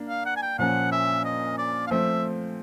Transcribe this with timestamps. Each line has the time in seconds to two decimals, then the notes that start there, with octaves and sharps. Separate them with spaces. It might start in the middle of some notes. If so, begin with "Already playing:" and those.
Already playing: A#3 D4
0.09 F5
0.26 F#5
0.36 G#5
0.42 G5
0.59 A#2 F3 A#3 C#4 F#5
0.92 E5
1.25 D#5
1.58 D5
1.87 F5
1.91 F3 A3 C4 E5